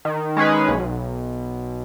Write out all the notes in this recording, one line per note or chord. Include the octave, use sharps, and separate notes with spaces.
D#3
G#3 C#4 G#4 B4
B1